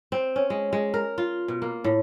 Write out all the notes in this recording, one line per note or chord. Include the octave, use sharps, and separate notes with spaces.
C4
C#4
G#3
G#3
A#4
F4
B2
A#3
A2